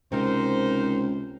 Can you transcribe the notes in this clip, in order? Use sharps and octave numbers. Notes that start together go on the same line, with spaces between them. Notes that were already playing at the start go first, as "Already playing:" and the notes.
C#2 C3 C4 D#4 A#4 C5